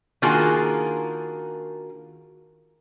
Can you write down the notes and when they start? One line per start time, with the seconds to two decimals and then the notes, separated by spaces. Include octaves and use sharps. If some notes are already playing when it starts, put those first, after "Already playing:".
0.22 D#3 A#3 D4 F4 F#4 G#4